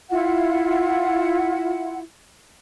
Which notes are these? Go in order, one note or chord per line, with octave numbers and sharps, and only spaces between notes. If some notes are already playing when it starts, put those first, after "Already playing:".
E4 F4 F#5